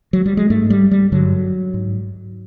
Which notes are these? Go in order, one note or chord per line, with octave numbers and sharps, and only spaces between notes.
F#3
G3
G#3
G#2 A3
G3
G3
G2 D3 F#3
G#2